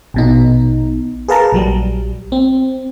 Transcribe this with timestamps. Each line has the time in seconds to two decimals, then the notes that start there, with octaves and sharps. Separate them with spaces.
0.14 A#1 B2 D#4
1.28 G#4 A#4 B4 F5 A5 A#5
1.52 A#1 F#3 G3
2.32 C4